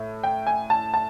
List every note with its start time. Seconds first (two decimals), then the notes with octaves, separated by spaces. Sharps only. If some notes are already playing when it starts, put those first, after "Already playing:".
Already playing: A2
0.23 G5
0.47 G#5
0.70 A5
0.94 A5